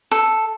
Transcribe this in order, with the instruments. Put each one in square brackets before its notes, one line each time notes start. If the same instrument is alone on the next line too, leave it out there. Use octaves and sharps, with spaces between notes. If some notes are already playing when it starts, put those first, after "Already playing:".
[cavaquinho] A4